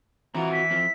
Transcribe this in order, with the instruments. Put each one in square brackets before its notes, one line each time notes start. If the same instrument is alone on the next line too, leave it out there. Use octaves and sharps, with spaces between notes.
[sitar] E3 [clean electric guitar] C4 F4 F#4 [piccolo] A#5
[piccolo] B6
[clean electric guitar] F3 C4